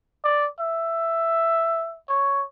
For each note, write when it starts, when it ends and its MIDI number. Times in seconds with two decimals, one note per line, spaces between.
0.25 0.47 74
0.60 1.97 76
2.09 2.44 73